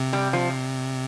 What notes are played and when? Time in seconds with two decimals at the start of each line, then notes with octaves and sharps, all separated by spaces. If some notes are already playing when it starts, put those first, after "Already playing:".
Already playing: C3
0.13 G3
0.33 F3